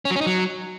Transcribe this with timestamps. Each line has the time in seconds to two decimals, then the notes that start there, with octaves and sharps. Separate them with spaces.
0.05 C#4
0.11 F#3
0.16 C#4
0.21 D#4
0.26 F#3